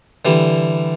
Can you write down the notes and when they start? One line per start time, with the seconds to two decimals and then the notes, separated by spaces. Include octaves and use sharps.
0.25 D3 E3 G3